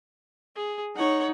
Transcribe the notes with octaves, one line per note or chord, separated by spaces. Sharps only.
G#4
D#4 C#5 F#5